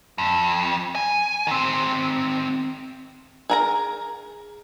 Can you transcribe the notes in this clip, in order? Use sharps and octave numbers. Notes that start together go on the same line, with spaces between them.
F2
G#5
D#3 C4
G#4 A#4 A#5